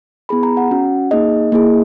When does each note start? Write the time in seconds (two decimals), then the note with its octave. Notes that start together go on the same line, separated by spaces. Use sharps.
0.29 B3 E4 G#4 B5
0.43 A#5
0.57 F#5
0.71 C#4 F#4
1.11 A#3 D#4 G#4 D#5
1.52 A#3 E4 G#4